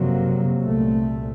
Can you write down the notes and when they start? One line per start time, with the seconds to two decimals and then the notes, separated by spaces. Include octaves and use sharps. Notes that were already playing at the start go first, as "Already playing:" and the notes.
Already playing: F#1 F2 C3 F#3 A#3
0.61 C2 A#2 A3